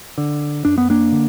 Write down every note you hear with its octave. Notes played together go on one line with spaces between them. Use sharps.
D3
F#2 D4
B3
A#3 D4
D3